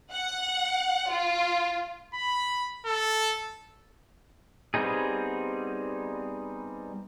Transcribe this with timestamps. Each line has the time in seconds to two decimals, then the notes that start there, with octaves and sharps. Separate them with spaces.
0.11 F#5
1.11 F4
2.14 B5
2.86 A4
4.74 G3 B3 C4 D#4 G#4